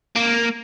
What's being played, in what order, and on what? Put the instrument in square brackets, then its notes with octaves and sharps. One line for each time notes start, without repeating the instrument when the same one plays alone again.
[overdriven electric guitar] A#3